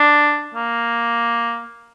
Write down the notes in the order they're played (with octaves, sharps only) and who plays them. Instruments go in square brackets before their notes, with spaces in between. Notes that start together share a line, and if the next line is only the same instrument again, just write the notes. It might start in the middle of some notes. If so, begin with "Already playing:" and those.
Already playing: [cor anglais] D4
A#3